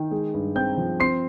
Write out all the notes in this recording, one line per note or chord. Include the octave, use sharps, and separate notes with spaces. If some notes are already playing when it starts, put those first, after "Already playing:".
Already playing: D#3 G5
G#3
G2
C4 G5 G6
F3
C4 C6 C7